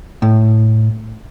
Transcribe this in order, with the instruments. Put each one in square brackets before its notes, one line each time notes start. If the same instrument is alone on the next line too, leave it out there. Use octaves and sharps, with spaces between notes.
[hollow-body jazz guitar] A2